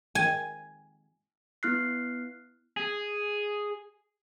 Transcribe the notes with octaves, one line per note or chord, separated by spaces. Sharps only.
G#5
B3 E4 F6 F#6 C7
G#4